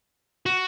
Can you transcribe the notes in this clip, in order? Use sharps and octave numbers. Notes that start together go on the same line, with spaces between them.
F#4